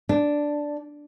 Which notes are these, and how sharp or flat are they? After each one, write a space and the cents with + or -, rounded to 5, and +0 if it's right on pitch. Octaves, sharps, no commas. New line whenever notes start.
D4 +0